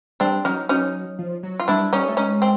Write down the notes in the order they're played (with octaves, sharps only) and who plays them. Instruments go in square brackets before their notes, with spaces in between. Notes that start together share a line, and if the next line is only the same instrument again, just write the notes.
[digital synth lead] G3 [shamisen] C4 D4
[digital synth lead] F#3 [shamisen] C#4 D#4
[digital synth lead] F#3 [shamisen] C#4 D#4
[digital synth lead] F3
F#3
[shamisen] F4
[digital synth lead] G3 [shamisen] D4 E4
[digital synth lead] G3 [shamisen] C#4 D#4
[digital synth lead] A3
[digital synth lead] G#3 [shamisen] C#4 D#4
[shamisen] C4